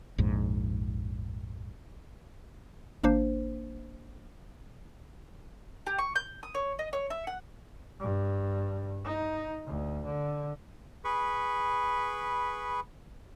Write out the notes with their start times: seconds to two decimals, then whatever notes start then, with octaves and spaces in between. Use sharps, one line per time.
0.18 A#1 F2 G#2
3.04 G#1 A#3 D4 C5
5.86 G4
5.98 C#6
6.16 G6
6.43 D#6
6.55 C#5
6.79 D#5
6.93 C#5
7.10 E5
7.27 F#5
8.00 G2
9.04 D#4
9.66 D2
10.05 D3
11.04 G#4 B4 B5 C#6